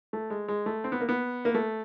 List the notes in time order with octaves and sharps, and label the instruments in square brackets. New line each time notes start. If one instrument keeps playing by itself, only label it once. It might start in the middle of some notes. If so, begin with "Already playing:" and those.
[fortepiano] A3
G#3
G#3
A3
C4
B3
A#3
B3
A#3
A3